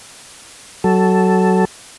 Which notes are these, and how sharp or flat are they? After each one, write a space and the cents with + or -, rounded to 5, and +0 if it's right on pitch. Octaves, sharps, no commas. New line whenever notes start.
F#3 +20 A4 +0